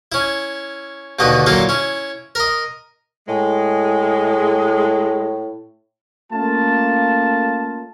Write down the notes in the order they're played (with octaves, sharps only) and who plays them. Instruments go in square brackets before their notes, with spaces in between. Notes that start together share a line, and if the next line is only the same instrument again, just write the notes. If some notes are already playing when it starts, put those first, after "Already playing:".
[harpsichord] C#4 E4
D#2 B2 D3 B4 D#5
A#2 F#3 A#3 E4 F4 A4
C#4 E4
A#4 D#5
[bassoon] A2 [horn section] G#3
[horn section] A3 A#3 C#4 F4 A5